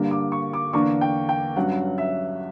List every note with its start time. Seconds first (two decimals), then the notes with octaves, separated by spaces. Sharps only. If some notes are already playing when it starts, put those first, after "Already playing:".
Already playing: G2 D3 G3 A#3
0.11 D6
0.32 C#6
0.53 D6
0.73 E2 D3 A#3 D4 C#6
1.01 G5
1.29 G5
1.56 G2 F#3 C#4 F#5
1.98 E5